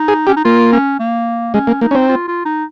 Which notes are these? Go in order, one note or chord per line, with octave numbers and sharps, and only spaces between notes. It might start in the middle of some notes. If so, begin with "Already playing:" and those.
Already playing: D#4
G#4
C#4 G4
D#4
A#3 F4
C#4
A#3
G#3 C#4
A#3
A#3 D#4
C#4
C4
F4
F4
D#4